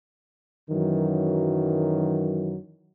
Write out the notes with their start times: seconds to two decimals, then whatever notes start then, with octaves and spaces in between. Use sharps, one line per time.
0.70 F#2 D#3 E3 F#3